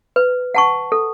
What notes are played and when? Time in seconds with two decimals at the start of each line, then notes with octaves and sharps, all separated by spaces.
0.16 B4
0.55 F#5 A5 C#6
0.92 A4